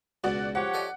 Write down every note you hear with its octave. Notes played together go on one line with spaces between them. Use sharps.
C#2 B2 F#4 D5 F#5
F3 G4 C#5 F#5
A4 D5 D#5